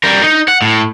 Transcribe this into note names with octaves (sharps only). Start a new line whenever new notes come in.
G3 A#4
D#4
F#5
A2